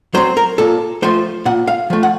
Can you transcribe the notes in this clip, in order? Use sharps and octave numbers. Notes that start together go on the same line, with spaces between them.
F#3 C4 C5
A#4
A#2 A4
F3 A3 C5
A#2 F#5
F5
F3 A3
F#5